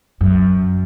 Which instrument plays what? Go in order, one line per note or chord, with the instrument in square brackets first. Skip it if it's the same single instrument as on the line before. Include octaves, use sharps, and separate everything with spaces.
[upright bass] F#2